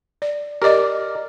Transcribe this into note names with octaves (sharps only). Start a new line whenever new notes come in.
D5
G4 A#4 D5 D#5